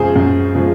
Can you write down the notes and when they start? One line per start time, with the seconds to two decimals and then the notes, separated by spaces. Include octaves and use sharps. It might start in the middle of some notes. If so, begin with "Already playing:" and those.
Already playing: F#2 C#3 F3 G#3 G#4 C5
0.16 F#2
0.55 C#3 F3 G#3